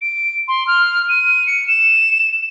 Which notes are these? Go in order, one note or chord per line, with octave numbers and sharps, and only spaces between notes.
D7
C6
F6
D#7
C#7
E7